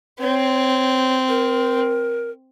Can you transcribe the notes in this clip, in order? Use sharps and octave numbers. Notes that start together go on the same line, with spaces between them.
C4 C#5
A#4